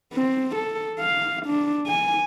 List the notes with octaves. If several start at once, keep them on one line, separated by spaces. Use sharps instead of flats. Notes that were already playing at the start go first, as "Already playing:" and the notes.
C4
A4
F5
D4
G#5